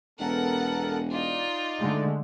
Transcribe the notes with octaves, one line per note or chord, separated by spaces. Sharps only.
E1 B3 A4 A#4 F#5
D#4 F4 D5
D3 G#3 A3